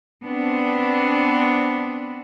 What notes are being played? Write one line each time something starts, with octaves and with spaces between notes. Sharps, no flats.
B3 C4 D4